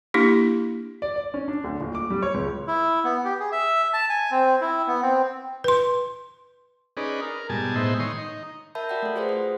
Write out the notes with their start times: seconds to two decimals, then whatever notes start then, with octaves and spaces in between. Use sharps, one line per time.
0.14 A#3 D4 E4 G4
1.02 D5
1.16 D5
1.34 C#4
1.48 D4
1.64 D2
1.81 D#1
1.95 D6
2.10 G3
2.22 C#5
2.34 C#2
2.67 E4
3.04 B3
3.25 G4
3.40 G#4
3.52 E5
3.93 A5
4.09 G#5
4.31 C4
4.61 E4
4.88 B3
5.03 C4
5.64 B4 C6
6.97 C#4 D#4 G#4 B4 D5
7.22 A#4
7.50 G#2 B2 G3 G#5 A5
7.76 A2 G#3 B3 D#4 C5 E5
8.00 D#3 C#5 C6 D#6
8.18 D#4
8.75 A#4 E5 A5 B5 G6
8.89 F#4 D5 F#5 G5
9.02 A3 A4
9.16 F4 F#4 G#4 B4 C5 F#5
9.29 D#6